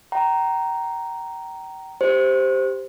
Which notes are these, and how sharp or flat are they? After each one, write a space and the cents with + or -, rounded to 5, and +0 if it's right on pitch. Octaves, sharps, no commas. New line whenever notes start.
G5 -35 A#5 +0
G4 +0 C5 +0